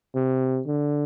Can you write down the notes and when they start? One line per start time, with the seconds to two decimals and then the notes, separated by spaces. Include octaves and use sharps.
0.15 C3
0.67 D3